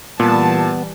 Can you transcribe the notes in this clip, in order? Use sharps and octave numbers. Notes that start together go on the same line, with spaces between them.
A#2 E3 G3 B3 A5